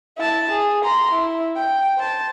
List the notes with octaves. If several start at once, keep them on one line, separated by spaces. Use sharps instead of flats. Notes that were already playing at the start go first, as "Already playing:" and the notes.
E4 A5
G#4
A#5 C6
E4
G5
C5 A5